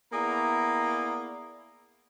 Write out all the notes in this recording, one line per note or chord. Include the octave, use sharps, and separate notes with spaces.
A#3 B3 E4 G#4 D5 A#5